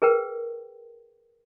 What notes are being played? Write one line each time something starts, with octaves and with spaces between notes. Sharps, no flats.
G#4 A#4 B4 G5